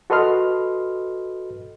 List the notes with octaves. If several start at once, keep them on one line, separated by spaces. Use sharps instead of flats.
F#4 A4 B4 D#5 C6 F6